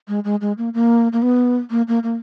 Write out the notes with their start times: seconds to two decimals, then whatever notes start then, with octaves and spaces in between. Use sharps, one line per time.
0.08 G#3
0.24 G#3
0.41 G#3
0.58 A#3
0.74 A#3
1.13 A#3
1.22 B3
1.71 A#3
1.88 A#3
2.03 A#3